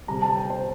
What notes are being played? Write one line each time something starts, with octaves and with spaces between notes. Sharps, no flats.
C3 G3 A#5
A5
G5
C5